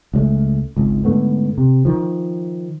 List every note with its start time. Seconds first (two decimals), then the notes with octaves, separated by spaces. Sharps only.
0.14 C#2 F#3 A3
0.77 G#1 C#2
1.05 G#2 D3 A3 B3
1.58 C3
1.85 D#3 F3